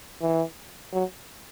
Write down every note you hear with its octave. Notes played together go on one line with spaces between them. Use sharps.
E3
F#3